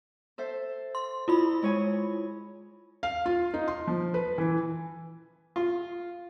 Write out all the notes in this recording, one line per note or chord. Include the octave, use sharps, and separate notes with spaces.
A4 C5 E5
C6
E4 F4 B5
G#3 C#5 G#5
F5
F4
D#4
C6
F3
B4
E3
F4